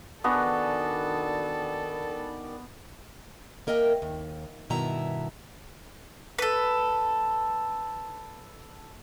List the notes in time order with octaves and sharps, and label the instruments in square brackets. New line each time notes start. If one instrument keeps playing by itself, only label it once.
[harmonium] D#3 D5 [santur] B3 [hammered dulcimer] D4 F#4 G#4 [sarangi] A4
[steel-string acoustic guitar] A#3 A#4 D#5 E5 G5
D#2
G2 B2 D#3 E4 E5 A#5
[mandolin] A4 B4